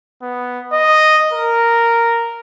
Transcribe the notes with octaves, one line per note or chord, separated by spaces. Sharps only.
B3
D#5
A#4